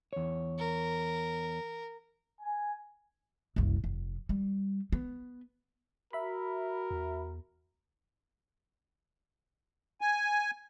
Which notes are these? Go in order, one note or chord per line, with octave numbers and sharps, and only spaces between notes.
E2 C#5
A#4
G#5
F#1 C2
F1
G3
B3
F#4 A#4 E5 B5
E2
G#5